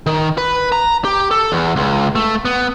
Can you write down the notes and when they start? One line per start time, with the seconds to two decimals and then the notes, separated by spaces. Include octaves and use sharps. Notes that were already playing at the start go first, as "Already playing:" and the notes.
0.06 D#3
0.38 B4
0.72 A#5
1.05 G4
1.31 A4
1.52 E2
1.76 C#2
2.15 A3
2.45 B3